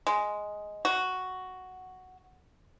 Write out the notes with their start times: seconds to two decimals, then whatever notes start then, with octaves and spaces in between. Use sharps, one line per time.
0.07 G#3
0.85 F#4